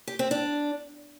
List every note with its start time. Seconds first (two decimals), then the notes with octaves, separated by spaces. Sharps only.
0.08 G4
0.19 C4
0.31 D4